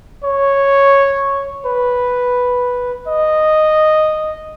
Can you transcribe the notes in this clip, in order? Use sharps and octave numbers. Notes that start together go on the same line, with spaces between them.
C#5
B4
D#5